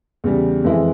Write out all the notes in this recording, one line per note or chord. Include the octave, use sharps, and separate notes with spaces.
E2 C#3 G3
F2 E3 G#3 E4